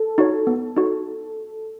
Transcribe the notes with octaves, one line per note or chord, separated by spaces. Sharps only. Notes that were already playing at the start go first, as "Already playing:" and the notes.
Already playing: A4
D#4 F#4 C#5
B3
D#4 F#4 C#5